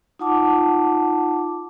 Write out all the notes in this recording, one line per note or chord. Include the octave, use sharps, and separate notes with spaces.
D#4 F4 F#5 A5 D6